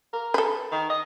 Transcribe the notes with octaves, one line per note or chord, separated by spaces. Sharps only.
A#4
A4 B4
D#3
D#5